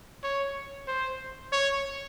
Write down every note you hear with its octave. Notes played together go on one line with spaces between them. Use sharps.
C#5
C5
C#5